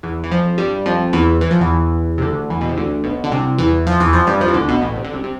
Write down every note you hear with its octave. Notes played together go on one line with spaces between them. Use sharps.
E2 E3
E3
F2 F3
G2 G3
F2 F3
E2 E3
E3
F3
E2 E3
C3
D2 D3
E2 E3
B2
C3
D2 D3
B1 B2
D3
C2 C3
E2 E3
F2 F3
E2 E3
F2 F3
G2 G3
F2 F3
E3
D2 D3
B1 B2
A1 A2
C3
D3
C2 C3
C3